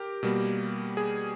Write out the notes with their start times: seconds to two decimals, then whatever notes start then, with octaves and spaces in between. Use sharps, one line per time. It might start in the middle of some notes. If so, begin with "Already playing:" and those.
Already playing: G4 A#4
0.23 B2 G3 A#3
0.97 G#4